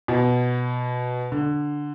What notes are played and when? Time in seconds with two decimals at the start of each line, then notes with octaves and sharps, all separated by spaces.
0.08 B2
1.32 D3